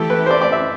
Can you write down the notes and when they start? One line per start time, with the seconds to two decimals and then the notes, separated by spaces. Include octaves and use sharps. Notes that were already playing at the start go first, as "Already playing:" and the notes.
Already playing: E3 A3 E4 G4 A4
0.10 B4
0.26 C5
0.31 D5
0.42 D5
0.52 E5